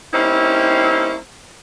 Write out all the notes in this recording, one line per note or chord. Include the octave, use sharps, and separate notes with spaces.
G3 A#3 C4 C#4 D#4 E4